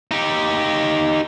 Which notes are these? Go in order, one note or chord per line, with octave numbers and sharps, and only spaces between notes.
D#4 G4